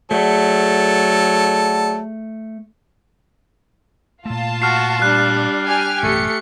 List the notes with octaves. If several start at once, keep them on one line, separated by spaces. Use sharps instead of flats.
F#3 A3 G#4 A4 D5 F#5
A#2 A3 F4 A5
F#4 F6 C7
G3 D4 F#6
G4 G#5 F6
A1 F#2 B2 A3 G4 C#7